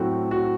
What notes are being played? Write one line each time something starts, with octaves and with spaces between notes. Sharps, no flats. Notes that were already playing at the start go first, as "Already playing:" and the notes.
Already playing: A2 F#3 A3 C4 F#4
F#4